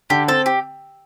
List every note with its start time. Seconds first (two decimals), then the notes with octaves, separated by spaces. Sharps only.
0.10 D3 G4
0.28 C4 A4
0.46 G4